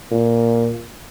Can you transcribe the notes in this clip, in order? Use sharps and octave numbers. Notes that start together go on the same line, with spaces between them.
A#2